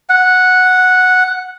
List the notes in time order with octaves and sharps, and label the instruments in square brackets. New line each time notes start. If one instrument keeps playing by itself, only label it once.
[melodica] F#5